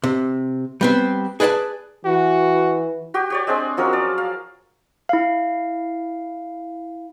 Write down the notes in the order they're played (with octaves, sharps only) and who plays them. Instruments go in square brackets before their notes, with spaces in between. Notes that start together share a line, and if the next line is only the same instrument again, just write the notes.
[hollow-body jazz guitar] C3
G3 B3 C4
G#4 B4 D5 F5 A5
[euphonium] E3 [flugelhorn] F#4
[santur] F#4 G4 G5
G4 C#5 D5
G#3 C4 D4 G#4
F3 F#3 C#4 A#4
D5
F5
[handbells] E4 F5